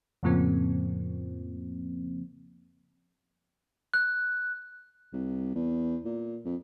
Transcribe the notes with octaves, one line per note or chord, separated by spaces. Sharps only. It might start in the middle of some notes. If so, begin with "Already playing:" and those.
F2 A2 C#3 F3 A#3 C4
F#6
C2
E2
A#2
F2